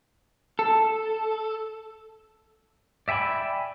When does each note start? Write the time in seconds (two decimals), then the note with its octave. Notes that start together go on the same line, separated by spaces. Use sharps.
0.59 A4
3.08 D5 E5 G5 G#5 B5